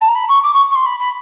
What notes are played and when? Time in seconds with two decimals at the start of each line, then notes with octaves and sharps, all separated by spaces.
0.01 A5
0.08 A#5
0.15 B5
0.29 C#6
0.43 D6
0.54 C#6
0.71 C#6
0.75 C6
0.85 B5
0.99 B5